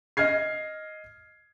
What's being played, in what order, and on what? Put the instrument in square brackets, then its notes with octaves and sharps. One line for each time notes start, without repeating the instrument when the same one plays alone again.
[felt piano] D#5 F6 G#6 C7